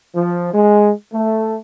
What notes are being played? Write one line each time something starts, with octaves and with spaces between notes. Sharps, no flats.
F3
G#3
A3